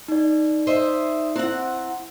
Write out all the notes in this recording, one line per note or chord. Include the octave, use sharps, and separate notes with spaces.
D#4 D5
C5 D#5 E5
C4 E4 F#5